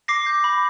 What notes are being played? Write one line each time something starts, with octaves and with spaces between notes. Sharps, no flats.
D6 A#6 C7
G6
B5